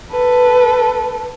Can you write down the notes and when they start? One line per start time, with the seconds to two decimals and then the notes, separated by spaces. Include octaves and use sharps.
0.11 A4 B4